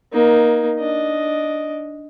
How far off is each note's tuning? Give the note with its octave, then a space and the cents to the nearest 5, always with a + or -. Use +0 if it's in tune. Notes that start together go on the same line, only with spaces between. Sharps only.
A#3 +20 D#4 +0
D4 +0 D#5 +0